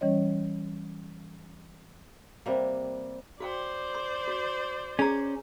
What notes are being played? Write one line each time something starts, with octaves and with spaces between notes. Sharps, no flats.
E3 G3 C#4 C#5 D#5
C3 G3 A#3
F#4 C5 D5 F5 G5
C6
F#4
C#4 G#4 A#5